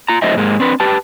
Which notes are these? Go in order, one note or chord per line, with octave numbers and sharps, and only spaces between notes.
F4 A#5
F#3 A3 D#4 C5 D#5 E5
G#2 G#3 A#3
C4 D4 B4
G4 B4 A5